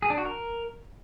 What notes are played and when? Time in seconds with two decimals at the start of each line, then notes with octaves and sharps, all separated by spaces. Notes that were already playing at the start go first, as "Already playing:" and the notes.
0.02 G#4
0.10 D4
0.18 F#4
0.25 A#4